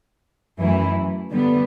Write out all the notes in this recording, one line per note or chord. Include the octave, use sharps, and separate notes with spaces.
F#2 E3 A3 E4
D3 G3 B3